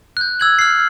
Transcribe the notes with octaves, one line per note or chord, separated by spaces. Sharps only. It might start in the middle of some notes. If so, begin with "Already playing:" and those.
F#6 G6
E6 G#6 F#7
F6 C7